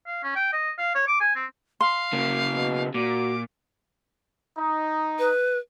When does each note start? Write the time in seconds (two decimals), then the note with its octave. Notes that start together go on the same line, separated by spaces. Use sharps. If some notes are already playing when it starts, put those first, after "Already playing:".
0.07 F5
0.23 C#4
0.35 G5
0.52 D#5
0.78 F5
0.95 C#5
1.07 D6
1.20 G#5
1.35 C4
1.81 F5 C6
2.13 C#3 A#3
2.53 B2
2.94 A#2 F#4 D6
4.58 D#4
5.19 B4